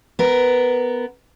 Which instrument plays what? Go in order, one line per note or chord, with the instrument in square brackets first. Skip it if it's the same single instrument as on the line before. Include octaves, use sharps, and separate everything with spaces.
[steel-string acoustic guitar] B3 A#4